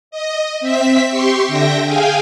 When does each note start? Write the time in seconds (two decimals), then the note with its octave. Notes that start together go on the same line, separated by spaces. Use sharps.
0.11 D#5
0.60 C4 E5 B6
1.09 G4 C6 C#6
1.48 D3 E5 G5 A#6
1.86 G#4 F5 G5 G#5